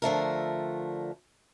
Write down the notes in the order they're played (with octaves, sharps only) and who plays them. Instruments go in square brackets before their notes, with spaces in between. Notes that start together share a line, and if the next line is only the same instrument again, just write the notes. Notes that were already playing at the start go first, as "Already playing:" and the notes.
[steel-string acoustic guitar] D3 F3 A3 A#4